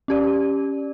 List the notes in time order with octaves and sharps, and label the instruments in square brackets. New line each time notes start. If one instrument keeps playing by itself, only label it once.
[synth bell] C#4 G4 D5